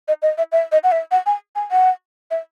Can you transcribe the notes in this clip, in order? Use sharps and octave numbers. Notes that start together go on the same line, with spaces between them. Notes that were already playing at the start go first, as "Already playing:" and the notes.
D#5
D#5
E5
E5
D#5
F#5
E5
F#5
G#5
G#5
F#5
E5